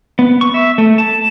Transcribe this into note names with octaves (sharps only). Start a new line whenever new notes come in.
B3
C#6
E5
A3
A5